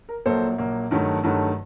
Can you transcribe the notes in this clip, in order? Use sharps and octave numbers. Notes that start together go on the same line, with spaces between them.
A#4
A#1 A#2 F#3 A#3 A4 C5
A#1 A#2 F#3 A#3
G2 D#3 F#3 A3
G2 D#3 F#3 A3